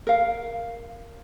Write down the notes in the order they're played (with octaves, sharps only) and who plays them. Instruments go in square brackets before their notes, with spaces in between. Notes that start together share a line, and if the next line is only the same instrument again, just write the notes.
[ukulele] A#4 F5